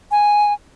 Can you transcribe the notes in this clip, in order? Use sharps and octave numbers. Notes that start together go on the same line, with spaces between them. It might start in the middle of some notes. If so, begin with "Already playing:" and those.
G#5